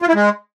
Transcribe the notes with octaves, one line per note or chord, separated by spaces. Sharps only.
F4
E4
G#3